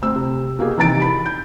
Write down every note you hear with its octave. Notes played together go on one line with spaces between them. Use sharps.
D2 C4 E6
C3
B2 A#3 G4 G#4
C3 D#3 E3 A#5 A6 D7
B5
G6